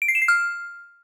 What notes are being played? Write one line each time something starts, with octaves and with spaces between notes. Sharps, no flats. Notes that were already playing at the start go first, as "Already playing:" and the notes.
D7
C7
E7
C7
F6